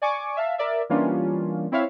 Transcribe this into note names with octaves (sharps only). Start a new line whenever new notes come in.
D5 G#5 C#6 D6
E5 F5 A5
A#4 D5 E5
E3 G3 A#3 C#4 D4 F4
C4 E4 C#5 E5 F5